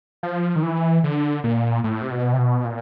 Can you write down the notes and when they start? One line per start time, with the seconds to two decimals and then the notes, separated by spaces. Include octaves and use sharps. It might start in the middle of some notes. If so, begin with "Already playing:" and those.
0.23 F3
0.56 D#3
0.63 E3
1.04 D3
1.44 A#2
1.84 A2
2.02 C3
2.11 B2
2.33 C3
2.38 B2
2.65 A#2